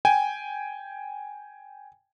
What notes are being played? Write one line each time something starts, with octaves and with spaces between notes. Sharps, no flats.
G5 G#5